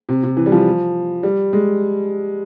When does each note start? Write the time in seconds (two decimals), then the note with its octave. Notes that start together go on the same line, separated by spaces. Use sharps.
0.09 C3
0.23 C3
0.37 E3
0.46 G3
0.52 F3
1.23 G3
1.53 G#3